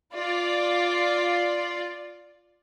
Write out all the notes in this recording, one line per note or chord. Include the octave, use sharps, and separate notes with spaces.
F4 D5